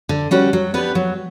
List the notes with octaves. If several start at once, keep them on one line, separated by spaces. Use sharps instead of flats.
D3
G3 C#4 F#4 B4
F#3
B3 D4 G4 B4
F#3